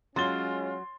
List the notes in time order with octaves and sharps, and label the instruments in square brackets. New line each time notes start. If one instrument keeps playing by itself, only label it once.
[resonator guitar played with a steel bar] F#3 [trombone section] G#3 C#4 [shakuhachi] F4 [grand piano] C6 A6 G7